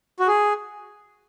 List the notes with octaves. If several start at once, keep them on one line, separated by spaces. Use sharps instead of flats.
F#4
G#4